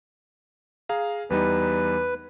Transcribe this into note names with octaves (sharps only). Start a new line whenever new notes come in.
G#4 F5 A#5
E2 G3 D#4 B4